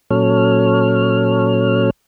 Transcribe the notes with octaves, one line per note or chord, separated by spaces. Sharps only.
A#2 F#3 C#4 A4 C#5 F6